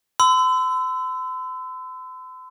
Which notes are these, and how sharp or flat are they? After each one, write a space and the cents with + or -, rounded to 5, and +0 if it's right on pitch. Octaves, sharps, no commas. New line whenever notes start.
C6 -45 E6 +0